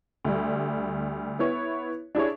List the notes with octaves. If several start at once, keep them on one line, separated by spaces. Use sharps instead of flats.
D2 G3
B3 E4 C#5
D4 E4 G#4 C#5